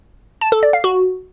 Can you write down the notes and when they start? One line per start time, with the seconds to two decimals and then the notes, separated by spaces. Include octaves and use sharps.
0.41 A5
0.52 A4
0.63 D5
0.73 F5
0.84 F#4